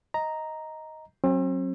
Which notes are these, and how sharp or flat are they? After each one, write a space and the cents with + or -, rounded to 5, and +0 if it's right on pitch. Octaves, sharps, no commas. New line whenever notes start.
D#5 +10 A#5 +0
F#3 +0 C4 +40